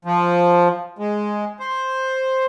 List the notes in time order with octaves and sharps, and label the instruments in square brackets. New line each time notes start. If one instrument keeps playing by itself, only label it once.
[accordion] F3
G#3
C5